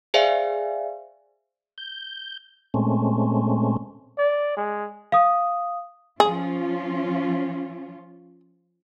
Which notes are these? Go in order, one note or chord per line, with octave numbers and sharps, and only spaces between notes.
G#4 C5 D5 E5 F5 G#5
G6
A#2 G#3 A3 C4 C#4
D5
G#3
F5 D#6
F3 C#4 F4 G#4